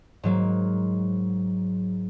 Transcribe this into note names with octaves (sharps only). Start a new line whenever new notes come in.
G#2 F#3 A#3